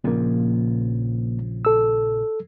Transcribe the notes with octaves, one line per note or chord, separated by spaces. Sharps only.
A#1 A#2 C#3 F3 A#3
A4 E6